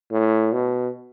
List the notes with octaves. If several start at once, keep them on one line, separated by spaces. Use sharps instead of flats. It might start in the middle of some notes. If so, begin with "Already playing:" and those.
A2
B2